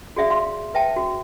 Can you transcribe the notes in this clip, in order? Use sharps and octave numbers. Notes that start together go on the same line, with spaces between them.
F#4 G#4 D5 E5 F5
F5 C6
B4 E5 G5 A5
F#4